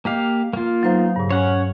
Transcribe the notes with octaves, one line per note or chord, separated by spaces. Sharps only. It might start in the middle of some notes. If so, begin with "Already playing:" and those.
A#3 G4 D#5 F5 D6
A#3 F4
E3 F#3 B3 D#4 C5 F5
G2 A#2 C#3
C#4 C#5 F#5